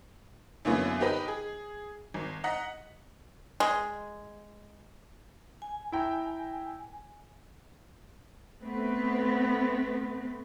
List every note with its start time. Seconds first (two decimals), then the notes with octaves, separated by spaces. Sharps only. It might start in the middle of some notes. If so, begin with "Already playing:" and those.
0.65 F#2 D3 E3 A#3 B3 C#4
1.00 D#4 G4 A#4 B4 D#5
1.28 G#4
2.14 G#1
2.44 D#5 F#5 A#5 B6
3.60 G#3
5.62 G#5
5.92 E4 G5 A#5
8.61 A3 B3 C4 B4